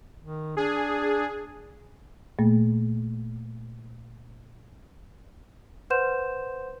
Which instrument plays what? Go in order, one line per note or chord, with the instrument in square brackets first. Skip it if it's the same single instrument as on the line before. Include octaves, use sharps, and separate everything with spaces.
[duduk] D#3
[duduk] D4 [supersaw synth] G#4
[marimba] A#2 A3 A#3
[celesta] B4 C5 F#5 C6 G6 E7